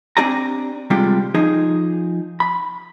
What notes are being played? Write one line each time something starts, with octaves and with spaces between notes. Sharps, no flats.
C4 D4 G4 D5 G#5 A#5
C3 G3 G#3 D4 F4 G4
F3 D#4 G#4
B5